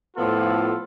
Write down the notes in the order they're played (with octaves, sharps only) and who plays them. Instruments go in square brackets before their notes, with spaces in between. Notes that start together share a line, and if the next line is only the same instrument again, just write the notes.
[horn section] A2 F3 B3 F4 A4